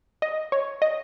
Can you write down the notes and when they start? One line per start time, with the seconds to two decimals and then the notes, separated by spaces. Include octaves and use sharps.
0.22 D#5
0.52 C#5
0.82 D#5